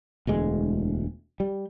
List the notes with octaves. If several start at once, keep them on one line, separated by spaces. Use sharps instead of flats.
E1 D2 G#3
G3